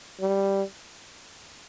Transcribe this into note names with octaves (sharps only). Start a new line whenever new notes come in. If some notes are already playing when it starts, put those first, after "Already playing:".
G3